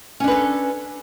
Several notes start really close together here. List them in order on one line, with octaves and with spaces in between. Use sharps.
C#4 D4 B4 A4